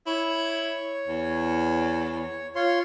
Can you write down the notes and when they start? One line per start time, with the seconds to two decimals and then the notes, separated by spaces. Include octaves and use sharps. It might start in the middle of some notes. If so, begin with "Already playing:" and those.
0.07 E4 C#5
1.08 E2
2.55 F4 C#5 C6